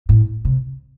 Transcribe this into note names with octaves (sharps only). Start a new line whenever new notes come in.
A2
C3